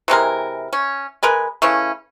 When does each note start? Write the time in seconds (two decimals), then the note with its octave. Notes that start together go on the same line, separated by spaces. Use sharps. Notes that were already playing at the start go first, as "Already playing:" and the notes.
0.08 C3 E3 G#3 A#4
0.73 C#4
1.23 G#3 A#4 B4 G#5
1.62 C#3 E3 A3 C#4